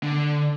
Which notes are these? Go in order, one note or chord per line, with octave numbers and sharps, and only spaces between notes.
D3